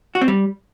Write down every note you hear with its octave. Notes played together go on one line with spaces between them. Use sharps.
F#4
C4
G3